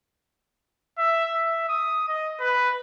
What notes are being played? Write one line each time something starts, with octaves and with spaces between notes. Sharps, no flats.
E5
E5
D#6
D#5
B4